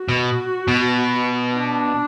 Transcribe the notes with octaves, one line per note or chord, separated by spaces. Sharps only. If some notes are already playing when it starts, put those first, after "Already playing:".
Already playing: F#4
B2
B2
D4